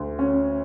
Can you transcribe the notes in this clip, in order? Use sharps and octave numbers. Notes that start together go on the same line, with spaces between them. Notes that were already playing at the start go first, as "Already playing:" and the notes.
Already playing: D2
C#4